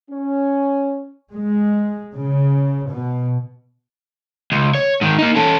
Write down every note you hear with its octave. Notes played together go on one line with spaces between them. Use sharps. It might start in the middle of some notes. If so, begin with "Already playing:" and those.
C#4
G#3
C#3
B2
C#2
C#5
G#2 D#3
A#3 D#4
C#4 A4